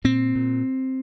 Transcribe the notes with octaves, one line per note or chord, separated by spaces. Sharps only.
A#2 C4
A#2